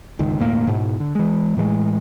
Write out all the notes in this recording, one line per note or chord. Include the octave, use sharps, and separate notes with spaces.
G1 C#2 D#3
E1 D2 A2 A#3
G#2 B2
D3
E3 G#3
A2 E3 G3 G#3